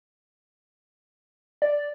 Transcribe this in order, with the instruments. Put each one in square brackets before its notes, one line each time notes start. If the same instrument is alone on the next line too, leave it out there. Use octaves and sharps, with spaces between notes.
[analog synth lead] D5